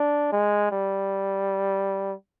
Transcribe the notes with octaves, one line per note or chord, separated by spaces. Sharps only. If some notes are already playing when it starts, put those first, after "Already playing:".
Already playing: D4
G#3
G3